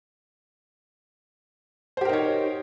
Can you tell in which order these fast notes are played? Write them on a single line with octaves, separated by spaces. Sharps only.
C5 G4 A#4 D#4 C#5